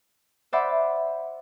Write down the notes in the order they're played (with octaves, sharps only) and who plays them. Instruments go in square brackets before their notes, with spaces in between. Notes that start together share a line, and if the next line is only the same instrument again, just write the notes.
[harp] C5 D5 E5 F#5 B5 D6